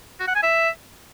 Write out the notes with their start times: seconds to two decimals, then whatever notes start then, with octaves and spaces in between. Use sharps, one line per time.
0.20 F#4
0.28 F#5
0.35 G#5
0.43 E5